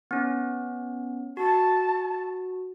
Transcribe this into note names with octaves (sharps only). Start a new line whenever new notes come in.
B3 C#4
F#4 A5